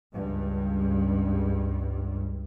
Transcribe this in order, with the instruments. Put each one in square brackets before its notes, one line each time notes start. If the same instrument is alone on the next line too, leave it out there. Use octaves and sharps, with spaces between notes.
[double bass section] C#2 G2